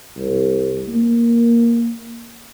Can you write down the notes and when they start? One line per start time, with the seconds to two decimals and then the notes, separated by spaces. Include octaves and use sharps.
0.17 C2
0.88 A#3